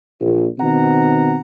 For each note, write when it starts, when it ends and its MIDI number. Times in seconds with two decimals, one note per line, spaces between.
0.20 0.47 34
0.59 1.38 47
0.59 1.38 51
0.59 1.38 60
0.59 1.38 78
0.59 1.38 82